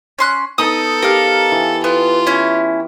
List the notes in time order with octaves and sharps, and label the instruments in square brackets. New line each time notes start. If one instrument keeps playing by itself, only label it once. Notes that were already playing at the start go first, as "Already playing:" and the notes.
[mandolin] C#4 C6 F#6
[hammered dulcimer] B3 D#4 [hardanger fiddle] A4 [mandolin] D#6
[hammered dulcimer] G4 [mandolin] A#4 F5
[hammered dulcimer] E3
[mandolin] B3 [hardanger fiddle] F4
[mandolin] C#4 E4